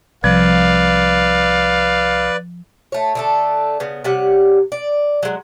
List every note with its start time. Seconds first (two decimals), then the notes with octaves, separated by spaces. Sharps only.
0.24 C2 F3 B4 D5 F5
2.92 A3 C#5
3.15 D3 A3 A4
3.80 C#3 B3
4.04 C3 G3 C#4 F#5
4.72 D5
5.23 F#3 G#3